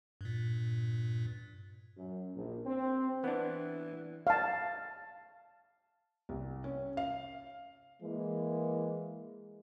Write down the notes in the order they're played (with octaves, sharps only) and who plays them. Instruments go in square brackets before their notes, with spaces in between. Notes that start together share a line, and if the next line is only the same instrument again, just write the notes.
[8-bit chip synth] G2 A#2
[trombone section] F#2
A#1
C4
[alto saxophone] E3 [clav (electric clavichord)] B3 D4
[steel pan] F5 A5
[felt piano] C2
C#4
F5
[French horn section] E3 G#3 A#3